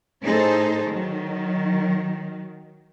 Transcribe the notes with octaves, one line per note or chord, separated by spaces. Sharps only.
A2 D#4 G#4 A4 C5
D#3 F#3